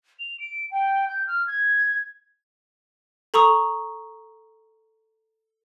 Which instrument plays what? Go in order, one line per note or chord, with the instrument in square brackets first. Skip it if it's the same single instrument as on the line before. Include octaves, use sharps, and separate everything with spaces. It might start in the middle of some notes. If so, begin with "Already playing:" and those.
[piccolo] F7
D7
G5
G6
F6
G#6
[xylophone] A4 A#5 C#6 D#6